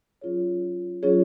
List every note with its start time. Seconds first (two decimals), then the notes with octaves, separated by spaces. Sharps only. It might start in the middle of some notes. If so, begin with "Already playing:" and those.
0.21 F#3 C#4 F4 G#4 C#5
1.03 F#3 C#4 F4 G#4 C#5